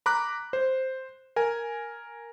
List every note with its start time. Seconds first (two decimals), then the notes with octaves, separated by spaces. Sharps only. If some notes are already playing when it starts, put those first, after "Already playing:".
0.06 A#5 B5 D6 F#6
0.53 C5
1.36 A#4 G#5